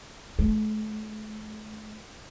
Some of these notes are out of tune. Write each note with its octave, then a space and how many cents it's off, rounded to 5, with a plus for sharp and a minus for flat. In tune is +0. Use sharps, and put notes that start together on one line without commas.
A3 -40